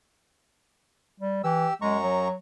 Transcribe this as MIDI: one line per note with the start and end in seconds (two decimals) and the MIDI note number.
1.20 1.44 55
1.44 1.67 52
1.44 1.74 67
1.44 1.74 88
1.82 2.28 42
1.82 1.97 56
1.82 2.28 82
1.82 2.28 85
2.03 2.33 54